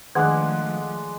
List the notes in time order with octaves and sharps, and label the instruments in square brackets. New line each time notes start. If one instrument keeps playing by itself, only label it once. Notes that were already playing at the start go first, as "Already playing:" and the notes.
[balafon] D#3 [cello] F3 A3 [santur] G#3 D4 [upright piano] F#5 F#6